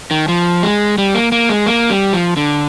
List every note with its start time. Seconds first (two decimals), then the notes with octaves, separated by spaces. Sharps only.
0.11 D#3
0.28 F3
0.63 G#3
0.98 G3
1.14 A#3
1.32 A#3
1.49 G#3
1.66 A#3
1.90 G3
2.13 F3
2.37 D3